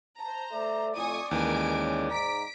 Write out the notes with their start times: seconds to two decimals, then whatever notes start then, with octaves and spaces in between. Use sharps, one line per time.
0.19 C5 A5 A#5
0.52 A3 A4 D5 E5
0.95 F2 A2 G#5 C#6 D#6
1.31 D#2 E3 G#3 C#4 A#4 G#5 D7
2.11 G#2 A#5 B6 D7